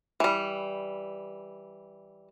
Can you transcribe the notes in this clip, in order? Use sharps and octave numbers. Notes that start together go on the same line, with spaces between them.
E3 G3